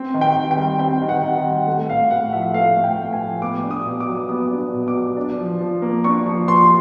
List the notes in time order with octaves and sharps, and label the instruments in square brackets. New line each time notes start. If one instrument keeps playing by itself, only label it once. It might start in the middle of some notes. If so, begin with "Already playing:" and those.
Already playing: [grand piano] C4
D#3
G5
D#3
G5
G3
C4 G5
D#3
F#5
D#3
F#5
G3
A3 F#5
A2 F5
A2 F#5
F3 E5
A3 F5
A2
G5
A2
G#5
F3
B3 D6
D4
D#6
B2
D6
F#3
B3 D#6
D4
B2
D6
F#3
D4
F3
F3
A#3
D4 C#6
F3
F3 C6